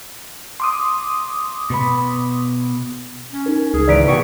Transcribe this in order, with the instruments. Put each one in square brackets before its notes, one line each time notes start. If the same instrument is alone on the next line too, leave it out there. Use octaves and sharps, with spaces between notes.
[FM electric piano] C6 D6 D#6
[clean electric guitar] B2 B3 B5
[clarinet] C#4
[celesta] D#4 A#4
[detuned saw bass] C#2 [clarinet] G#4
[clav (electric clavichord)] G#1 E3 A#5 [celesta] D5 B6 D7
[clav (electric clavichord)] B2 F#4 G4 [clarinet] C#6